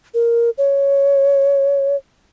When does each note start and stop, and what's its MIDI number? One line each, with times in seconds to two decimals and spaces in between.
0.14 0.50 70
0.58 1.96 73